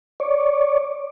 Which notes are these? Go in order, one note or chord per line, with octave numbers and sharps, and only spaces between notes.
C#5 D5